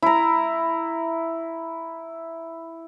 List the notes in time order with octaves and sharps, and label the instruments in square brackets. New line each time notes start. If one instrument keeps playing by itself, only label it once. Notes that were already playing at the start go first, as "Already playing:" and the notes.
[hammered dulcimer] E4 A#5